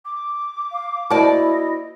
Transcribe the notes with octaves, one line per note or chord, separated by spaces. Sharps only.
D6
F5
A#3 E4 F#4 C5 D5 D#5 A5